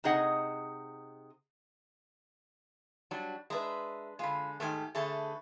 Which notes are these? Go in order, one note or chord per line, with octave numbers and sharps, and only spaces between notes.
C3 D#4 G#4 D#5 F#5
F#3 G3 D4
G#3 D4 B4 E5 A#5
D3 G#3 F4 B5
G#2 D#3 A3 G4 G#5
D3 A3 G#4 B4 C#5 A5